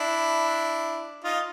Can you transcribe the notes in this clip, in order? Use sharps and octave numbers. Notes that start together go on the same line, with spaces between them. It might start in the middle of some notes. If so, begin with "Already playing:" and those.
Already playing: D4 E4
D#4 F4